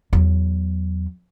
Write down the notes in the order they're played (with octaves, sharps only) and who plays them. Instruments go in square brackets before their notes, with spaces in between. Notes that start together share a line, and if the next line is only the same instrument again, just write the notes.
[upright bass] E2 F#3